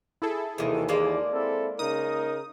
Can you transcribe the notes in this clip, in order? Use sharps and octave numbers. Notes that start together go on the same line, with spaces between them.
E4 G#4 A4
D#2 C3 D#3 E3
G#3 A#3 D5
C4 E4 A4
C#3 D#4 A#4 D#6